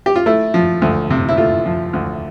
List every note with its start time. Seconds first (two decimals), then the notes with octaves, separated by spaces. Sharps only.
0.06 G4
0.16 F4
0.26 A3 E4
0.54 F3
0.82 D2
1.10 C3
1.29 E4
1.37 A3 F4
1.66 F3
1.93 D2